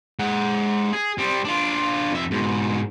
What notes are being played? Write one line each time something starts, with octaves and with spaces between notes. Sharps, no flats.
G#3 F#5
G#4
G3 C4
D4 F4
F2 E5
G#2 B2